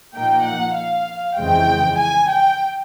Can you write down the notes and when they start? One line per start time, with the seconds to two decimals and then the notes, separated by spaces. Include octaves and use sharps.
0.14 A#2 F3 A#3 D#4 G5
0.45 F#5
0.75 F5
1.37 F2 C#3 E3 G#3 C4 G5
1.99 G#5
2.30 G5